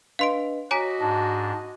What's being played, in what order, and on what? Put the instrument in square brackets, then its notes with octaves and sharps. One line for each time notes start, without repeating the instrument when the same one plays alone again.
[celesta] D4 B4 D#5 [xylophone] F5 C6 D7
[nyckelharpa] F#4 D#5 [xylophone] C#5 G#5 A#5 [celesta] D6 B6
[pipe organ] G#2 D4 [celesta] A5